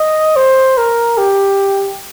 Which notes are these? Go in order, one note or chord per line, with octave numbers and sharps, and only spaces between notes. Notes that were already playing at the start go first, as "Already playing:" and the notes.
Already playing: D#5
C5
A#4
G4